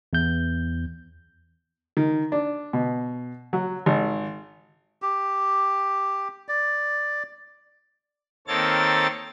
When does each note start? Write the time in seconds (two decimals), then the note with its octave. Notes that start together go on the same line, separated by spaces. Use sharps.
0.13 E2 G6
1.97 D#3
2.32 D4
2.73 B2
3.53 F#3
3.86 G#1
5.02 G4
6.48 D5
8.47 D#3 A#3 C4 A4 C#5 A6